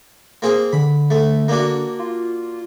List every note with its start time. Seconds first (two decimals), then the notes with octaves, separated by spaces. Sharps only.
0.42 A#3 C4 G#4
0.73 D3 B5
1.10 A3
1.48 A#3 D4 F#4
1.99 F4